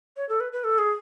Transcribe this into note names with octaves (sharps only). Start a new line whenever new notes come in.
C#5
A4
B4
B4
A4
G#4